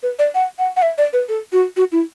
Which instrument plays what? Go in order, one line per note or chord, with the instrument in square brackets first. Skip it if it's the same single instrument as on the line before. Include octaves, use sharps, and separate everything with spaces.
[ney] B4
D5
F#5
F#5
F#5
E5
D5
B4
A4
F#4
F#4
E4